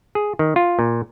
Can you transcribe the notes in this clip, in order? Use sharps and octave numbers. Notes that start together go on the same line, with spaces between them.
G#4
D#3
F4
A#2